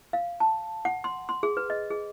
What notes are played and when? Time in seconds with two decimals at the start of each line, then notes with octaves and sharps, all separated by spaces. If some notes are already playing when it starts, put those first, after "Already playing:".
0.13 F5
0.40 A5
0.85 F#5
1.04 C6
1.29 C6
1.43 G#4
1.57 B4
1.70 D#5
1.90 G#4